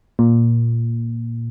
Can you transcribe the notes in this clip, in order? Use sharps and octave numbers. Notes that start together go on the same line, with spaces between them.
A#2